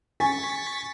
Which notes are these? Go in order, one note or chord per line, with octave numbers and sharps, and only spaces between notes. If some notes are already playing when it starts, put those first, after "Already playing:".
G#5 C#6 A6 B6